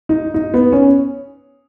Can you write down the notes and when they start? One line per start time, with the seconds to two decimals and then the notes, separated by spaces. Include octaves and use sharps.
0.09 D#4
0.34 D#4
0.54 B3
0.72 C#4